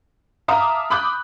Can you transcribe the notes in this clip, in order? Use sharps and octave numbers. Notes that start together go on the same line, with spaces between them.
E5 F5 A5 A#5 D6 D#6
B5 D6 D#6 F#6 G6